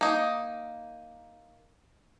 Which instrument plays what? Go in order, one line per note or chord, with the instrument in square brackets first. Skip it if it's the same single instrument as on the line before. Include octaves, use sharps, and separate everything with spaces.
[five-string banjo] A#3 D#4